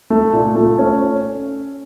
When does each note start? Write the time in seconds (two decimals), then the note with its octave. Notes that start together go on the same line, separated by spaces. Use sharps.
0.10 A3
0.33 A#2
0.56 A3
0.78 C#4